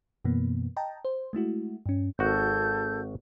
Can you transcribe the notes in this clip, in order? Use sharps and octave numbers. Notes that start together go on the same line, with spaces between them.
F#2 B2 E3 A#3 B3
D#5 G5 A5 A#5
C5
G#3 A3 E4 F#4
G2 C#4
G#1 F#4 A4 G6